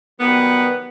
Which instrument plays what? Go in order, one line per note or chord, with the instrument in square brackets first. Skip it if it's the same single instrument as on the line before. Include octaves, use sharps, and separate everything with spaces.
[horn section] D#3 F#3 G3 B3